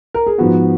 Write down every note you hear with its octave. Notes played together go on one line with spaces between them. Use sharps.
A#4
G#4
G#2 F3 B3 F#4